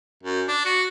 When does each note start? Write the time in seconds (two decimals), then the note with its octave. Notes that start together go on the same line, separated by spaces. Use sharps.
0.23 F#2
0.48 D4
0.65 F#4